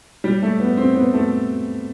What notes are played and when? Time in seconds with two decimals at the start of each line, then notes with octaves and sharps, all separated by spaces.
0.24 G3
0.43 A3
0.60 B3
0.77 C4
0.95 B3
1.14 A3